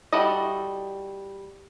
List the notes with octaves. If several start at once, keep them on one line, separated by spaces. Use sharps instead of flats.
G3 E4 F#4 A4 D#5